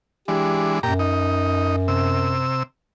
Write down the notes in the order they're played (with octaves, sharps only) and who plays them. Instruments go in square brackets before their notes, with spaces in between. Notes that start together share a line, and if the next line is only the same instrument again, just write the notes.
[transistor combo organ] E3 G#3 D4 [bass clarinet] G4
[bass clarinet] F#2 [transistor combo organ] A#2 G4 A#5
[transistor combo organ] D#4
C3 E6